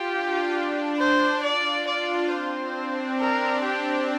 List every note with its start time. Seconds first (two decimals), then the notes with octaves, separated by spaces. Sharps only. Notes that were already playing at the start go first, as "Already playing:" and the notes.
Already playing: F4 G4
0.11 D4
0.99 C5
1.43 F4 D5
1.86 D4 D5
2.30 C4 C5
2.75 D4
3.18 A#4
3.63 G4